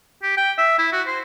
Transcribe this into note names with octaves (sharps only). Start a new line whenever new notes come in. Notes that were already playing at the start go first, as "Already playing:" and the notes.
G4
G5
E5
E4
F#4
C5